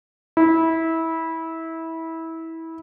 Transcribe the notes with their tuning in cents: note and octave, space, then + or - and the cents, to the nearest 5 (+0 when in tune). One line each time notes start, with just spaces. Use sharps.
E4 -20